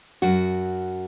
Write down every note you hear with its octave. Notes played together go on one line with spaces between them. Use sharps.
F#2 F#4